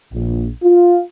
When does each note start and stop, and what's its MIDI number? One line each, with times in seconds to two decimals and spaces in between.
0.13 0.48 34
0.62 1.01 65